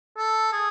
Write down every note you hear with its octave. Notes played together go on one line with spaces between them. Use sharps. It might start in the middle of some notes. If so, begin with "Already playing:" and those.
A4
G#4